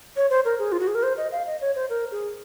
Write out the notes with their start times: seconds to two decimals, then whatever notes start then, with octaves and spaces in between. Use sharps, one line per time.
0.16 C#5
0.30 C5
0.45 A#4
0.59 G#4
0.72 F4
0.80 F#4
0.87 G#4
0.95 A#4
1.03 C5
1.17 D#5
1.32 F5
1.47 D#5
1.61 C#5
1.76 C5
1.90 A#4
2.12 G#4